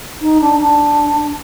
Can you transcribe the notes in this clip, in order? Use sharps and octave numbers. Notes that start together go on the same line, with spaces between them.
D#4
D4
D4